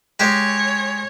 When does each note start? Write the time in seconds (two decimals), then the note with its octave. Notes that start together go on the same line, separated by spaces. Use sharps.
0.19 G#3 G4 G#4 C#5